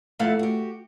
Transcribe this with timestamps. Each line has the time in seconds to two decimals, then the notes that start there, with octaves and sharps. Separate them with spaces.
0.19 F2 A3 E4 A4 F5 F#5
0.39 F#4 G4